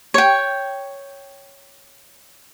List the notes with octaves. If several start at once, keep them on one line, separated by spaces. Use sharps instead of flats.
C#5 G5